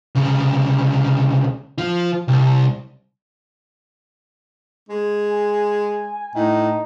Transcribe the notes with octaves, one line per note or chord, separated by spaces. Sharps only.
C2 C#3
F3 F4
C2
G#3
G#5
A2 D#4